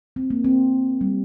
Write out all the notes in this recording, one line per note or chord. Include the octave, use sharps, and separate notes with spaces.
C4
A#3
C4
G3